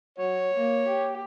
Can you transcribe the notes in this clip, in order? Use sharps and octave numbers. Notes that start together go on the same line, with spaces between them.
F#3 C#5
A#3
G4